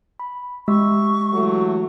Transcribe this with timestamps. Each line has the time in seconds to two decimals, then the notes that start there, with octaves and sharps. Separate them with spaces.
0.20 B5
0.68 G#3 G4 E5 C#6 E6
1.33 E3 F#3 A3